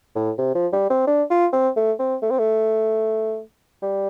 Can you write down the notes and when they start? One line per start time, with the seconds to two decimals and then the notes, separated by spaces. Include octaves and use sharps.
0.15 A2
0.38 C3
0.55 F3
0.73 G3
0.90 C4
1.07 D4
1.31 F4
1.53 C4
1.76 A3
1.99 C4
2.22 A3
2.30 C4
2.39 A3
3.82 G3